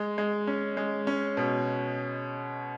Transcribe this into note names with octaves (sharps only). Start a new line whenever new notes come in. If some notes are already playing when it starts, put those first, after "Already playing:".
Already playing: G#3
G#3
C#4
G#3
C#4
B2